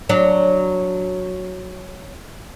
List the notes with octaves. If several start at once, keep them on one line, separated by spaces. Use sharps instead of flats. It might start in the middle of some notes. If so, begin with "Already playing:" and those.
F#3 D4